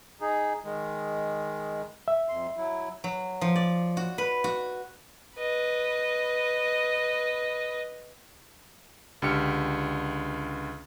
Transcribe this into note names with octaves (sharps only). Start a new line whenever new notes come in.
D#4 G#4
D#3 G#3
E5
F2 C6
F#3 E4
F#3
F3
D5
F#4
B4
F#4
B4 D#5
C#2 D3 G4 F6 C#7